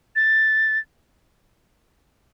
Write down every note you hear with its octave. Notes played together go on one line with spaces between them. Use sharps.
A6